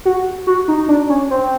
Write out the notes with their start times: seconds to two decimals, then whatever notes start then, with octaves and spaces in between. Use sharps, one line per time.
0.05 F#4
0.47 F#4
0.68 D#4
0.88 D4
1.09 C#4
1.31 C4